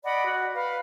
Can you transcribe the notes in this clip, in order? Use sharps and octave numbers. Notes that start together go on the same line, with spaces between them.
D5 D#5 F#5 B5
F#4
B4 F5 B5